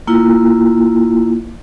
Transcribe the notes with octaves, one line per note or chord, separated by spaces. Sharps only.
A#3 E4 F4